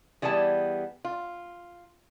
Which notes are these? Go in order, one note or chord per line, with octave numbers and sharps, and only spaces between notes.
E3 G3 B3 G#4 A5
F4